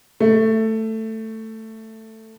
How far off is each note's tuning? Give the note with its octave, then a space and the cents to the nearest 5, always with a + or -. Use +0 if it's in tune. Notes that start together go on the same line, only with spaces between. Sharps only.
A3 +10